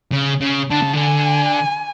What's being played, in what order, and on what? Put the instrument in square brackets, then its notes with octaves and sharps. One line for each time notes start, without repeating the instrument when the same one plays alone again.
[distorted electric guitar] C#3
C#3
[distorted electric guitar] D3 [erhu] A5
[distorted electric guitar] C#3
D3
[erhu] G#5